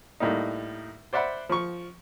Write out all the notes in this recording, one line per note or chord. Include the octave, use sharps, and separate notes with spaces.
A2 G3 A#3 D#4
C5 D5 E5 F#5 B5
F3 C#6